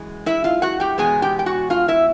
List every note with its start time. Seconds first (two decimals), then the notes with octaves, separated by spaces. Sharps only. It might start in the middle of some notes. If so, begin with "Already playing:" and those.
Already playing: F#2 E3 G#3
0.26 E4 E5
0.44 F4 F5
0.62 F#4 F#5
0.80 G4 G5
0.98 E2 B2 G#3 B3 G#4 G#5
1.22 G4 G5
1.39 G5
1.46 F#4 F#5
1.70 F4 F5
1.88 E4 E5